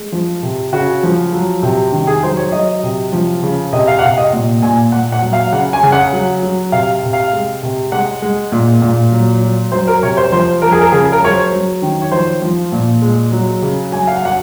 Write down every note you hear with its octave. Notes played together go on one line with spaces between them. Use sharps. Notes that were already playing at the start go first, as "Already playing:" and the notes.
Already playing: G#3
F3
C3
C#3 F#4
F3
F#3
C3
D#3
G#4
F#3 C5
C#5
F#3 D#5
C3
F3
C#3
C3 D#5
F5
F#5
C3 F5
D#5
A#2
A#2 G#5
A#2 F#5
F#5
F#3
F5
C#3 F#5
G#5
C#3
F#5
F#3
F#3
C3 F5
C3
F5
G#3
C3
G#3 F#5
G#3
A#2
A#2
F#3
F#3
F#3 C5
A#4
C3 C#5
C5
F3 C5
F3 A#4
G#4
A#4
C#3 G#4
A#4
F#3 C#5
C5
F#3
D#3
C#5
F3 C5
F3
A#2
G#3
F#3
C#3
F#3 G#5
F5
F#5
F#3 F#5